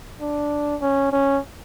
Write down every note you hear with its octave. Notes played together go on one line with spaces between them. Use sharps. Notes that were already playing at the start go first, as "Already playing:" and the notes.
D4
C#4
C#4